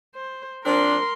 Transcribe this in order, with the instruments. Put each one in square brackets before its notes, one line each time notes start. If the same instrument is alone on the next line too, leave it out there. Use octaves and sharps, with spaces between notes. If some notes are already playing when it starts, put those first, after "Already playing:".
[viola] C5
[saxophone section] F3 C4 D4 [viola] A#4 C6